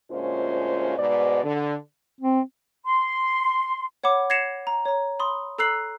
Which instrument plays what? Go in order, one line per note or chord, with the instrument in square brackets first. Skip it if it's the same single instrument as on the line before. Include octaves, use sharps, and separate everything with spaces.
[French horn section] D2 A#2 G#3 C#4 F4 C5
G#2 B2 D5
D3
[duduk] C4
[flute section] C6
[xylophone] C#5 F#5 B5 D6
G#6 A#6 C7 C#7 E7 F7
A#5
C#5 A#5
B5 C6 D#6
A4 A#5 E6 F#6 C7 F#7